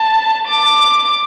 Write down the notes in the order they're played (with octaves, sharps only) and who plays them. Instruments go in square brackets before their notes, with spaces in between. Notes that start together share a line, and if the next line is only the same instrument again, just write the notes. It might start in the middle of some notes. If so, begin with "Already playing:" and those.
Already playing: [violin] A5
D6